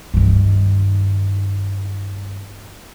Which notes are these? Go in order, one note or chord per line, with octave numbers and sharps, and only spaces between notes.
G2 D#3